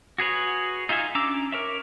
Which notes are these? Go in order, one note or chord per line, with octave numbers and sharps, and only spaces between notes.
F#4 G#4 B4 C#5
D#4 F4 G#4 E5 G#5
C#4 D4 A#5 D6 E6
A#4 C#5 E5